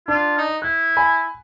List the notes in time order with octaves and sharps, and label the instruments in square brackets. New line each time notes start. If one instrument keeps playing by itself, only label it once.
[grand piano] D4 [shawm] F4
[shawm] D#4
[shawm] E4 [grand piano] F#6
[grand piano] G#5 B5